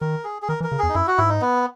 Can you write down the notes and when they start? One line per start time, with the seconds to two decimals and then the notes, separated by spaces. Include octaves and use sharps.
0.01 D#3 A#4
0.24 G#4
0.42 G#4
0.49 D#3 A#4
0.60 E3
0.64 A#4
0.72 C#3
0.79 E2 G#4
0.89 D#4
0.94 F#2 E4
1.07 F#4
1.18 G#2 E4
1.29 D#4
1.41 B3